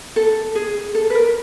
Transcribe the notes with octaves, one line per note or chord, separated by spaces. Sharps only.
A4
G#4
A4
B4
A#4